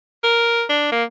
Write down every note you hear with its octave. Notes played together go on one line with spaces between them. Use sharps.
A#4
D4
A#3